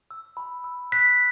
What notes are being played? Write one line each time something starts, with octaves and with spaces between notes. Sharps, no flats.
E6
B5
E6
F#6 B6